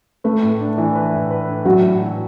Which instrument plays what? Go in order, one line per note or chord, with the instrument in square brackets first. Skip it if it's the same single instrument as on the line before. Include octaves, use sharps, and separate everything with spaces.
[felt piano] A3 [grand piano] B4
[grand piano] A2
D4
E3
B4
A2
B4
D4
[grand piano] A2 [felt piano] F#3
[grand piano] A2
E3